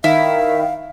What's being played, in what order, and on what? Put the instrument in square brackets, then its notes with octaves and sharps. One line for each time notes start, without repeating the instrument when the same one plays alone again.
[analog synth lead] D#3 [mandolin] E4 [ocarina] F5